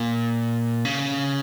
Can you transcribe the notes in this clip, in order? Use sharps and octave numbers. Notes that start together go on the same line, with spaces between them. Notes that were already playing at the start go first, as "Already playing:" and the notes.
Already playing: A#2
C#3